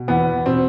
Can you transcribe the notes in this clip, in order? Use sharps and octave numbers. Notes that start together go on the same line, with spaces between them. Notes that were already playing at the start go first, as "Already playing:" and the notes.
Already playing: B2
E2 B3
B2 C4